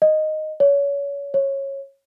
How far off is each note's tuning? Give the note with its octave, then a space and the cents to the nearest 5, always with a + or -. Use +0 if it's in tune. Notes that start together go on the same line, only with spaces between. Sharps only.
D#5 -5
C#5 +30
C#5 -15